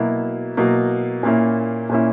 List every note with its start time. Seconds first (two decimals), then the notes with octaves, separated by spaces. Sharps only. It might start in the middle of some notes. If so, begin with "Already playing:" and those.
Already playing: B2 F#3 A#3 E4
0.57 B2 F#3 A#3 E4
1.23 A#2 A#3 C#4 E4
1.89 A#2 A#3 C#4 E4